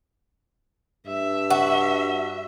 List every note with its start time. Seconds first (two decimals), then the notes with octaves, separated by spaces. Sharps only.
1.07 G2 E5
1.50 F#4